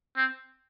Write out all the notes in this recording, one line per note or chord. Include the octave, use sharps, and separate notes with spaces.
C4